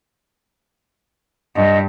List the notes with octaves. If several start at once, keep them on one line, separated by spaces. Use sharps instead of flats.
G2 D#5